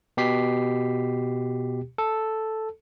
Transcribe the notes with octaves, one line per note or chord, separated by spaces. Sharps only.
B2 G4 B6 C7
A4